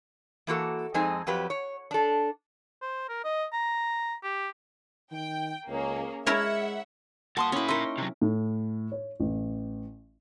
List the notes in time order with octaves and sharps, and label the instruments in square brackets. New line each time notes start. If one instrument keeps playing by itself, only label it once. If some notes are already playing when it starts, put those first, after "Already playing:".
[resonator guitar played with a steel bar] E3 A#3 F#4 A4
F2 G#3 C4 D#4 G#5
F2 F#3 G4 B4
C#5
D4 A4
[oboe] C5
A#4
D#5
A#5
G4
[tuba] D#3 [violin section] G5
[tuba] C#2 [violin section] A#3 C#4 G#4
[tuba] G#3 [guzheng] E4 A#4 C#5 [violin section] E5 F#5
[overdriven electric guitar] G2 A5 [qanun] A#3 [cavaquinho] F#4 C6 D#6
[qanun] C#4 E4 [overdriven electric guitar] C#5 B5
[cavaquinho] D#4 C6 C#6 [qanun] A#4 E5
[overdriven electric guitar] C3 F#3
[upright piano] A2
C#5
A1